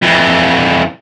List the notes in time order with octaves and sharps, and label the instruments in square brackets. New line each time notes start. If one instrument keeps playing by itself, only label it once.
[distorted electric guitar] F2 E3